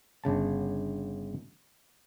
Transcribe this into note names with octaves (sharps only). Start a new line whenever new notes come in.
G1 C#3 A5